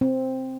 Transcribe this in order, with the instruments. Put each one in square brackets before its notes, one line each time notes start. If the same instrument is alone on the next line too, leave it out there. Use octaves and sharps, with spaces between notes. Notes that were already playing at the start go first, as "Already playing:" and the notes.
[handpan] C4